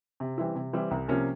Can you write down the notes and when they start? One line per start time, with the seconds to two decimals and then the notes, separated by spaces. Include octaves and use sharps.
0.20 C3
0.38 E3 G3 C4 E4
0.55 C3
0.73 E3 G3 C4 E4
0.91 C2
1.08 C3 F3 A#3 C#4